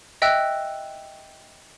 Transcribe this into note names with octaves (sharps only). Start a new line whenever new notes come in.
D#5 E5 G5 E6 F#6